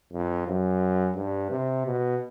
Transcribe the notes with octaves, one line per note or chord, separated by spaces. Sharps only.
F2
F#2
G2
C3
B2